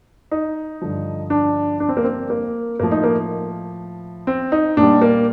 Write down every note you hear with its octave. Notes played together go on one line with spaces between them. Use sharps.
D#4
G2 D3 F3
D4
D4
C4
A#3
C4
A#3
A2 F3 A#3
D#4
A#3
C4
D#4
A#2 D4
G3
A#3